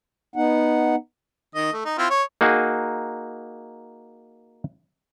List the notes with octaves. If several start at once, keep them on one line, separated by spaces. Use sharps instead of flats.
B3 D#4 F#5
D#3 D#5
A3
D#4
C4 E4 F4
C#5
A#3 D#4 F#4 G#4